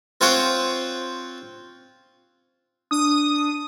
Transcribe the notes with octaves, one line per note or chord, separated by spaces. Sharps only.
C4 F4 C5 C#5 F#5 G5
D4 D#6